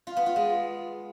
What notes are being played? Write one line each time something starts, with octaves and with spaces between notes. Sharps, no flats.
F4
B3
F4
G#3